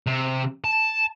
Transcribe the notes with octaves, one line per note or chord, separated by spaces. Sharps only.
C3
A5